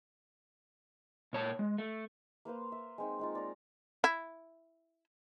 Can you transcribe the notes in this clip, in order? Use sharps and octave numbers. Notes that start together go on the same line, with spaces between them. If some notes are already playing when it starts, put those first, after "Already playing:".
A#2 C#5 A5
G#3
A3
A#3 B4 C5 F5
E5
G#3 C4 D#4
G#3 D#4 F4
D5 A#5
E4